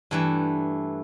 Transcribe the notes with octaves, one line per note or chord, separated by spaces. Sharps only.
G2 E3 A3